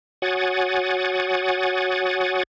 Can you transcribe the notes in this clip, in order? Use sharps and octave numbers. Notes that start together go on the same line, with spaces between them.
F#4 C#5 F#5 G#5 D#6 A6